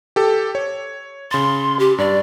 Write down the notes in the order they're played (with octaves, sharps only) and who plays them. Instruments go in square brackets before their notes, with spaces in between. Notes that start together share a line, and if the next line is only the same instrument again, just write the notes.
[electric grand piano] G4 A4
C#5
[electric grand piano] C#3 A6 [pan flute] C6
[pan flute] G4
[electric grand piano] G2 [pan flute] D5